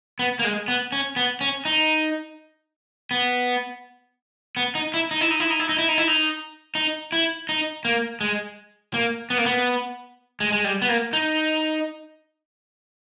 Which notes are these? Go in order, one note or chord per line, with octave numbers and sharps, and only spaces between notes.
B3
A#3
G#3
B3
C#4
B3
C#4
D#4
B3
B3
D#4
E4
D#4
E4
D#4
E4
D#4
E4
D#4
E4
D#4
E4
D#4
D#4
E4
D#4
A#3
G#3
A#3
B3
A#3
B3
G#3
G#3
G3
B3
A#3
D#4